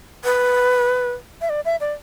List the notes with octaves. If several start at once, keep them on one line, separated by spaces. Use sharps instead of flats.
B4
E5
D5
E5
D5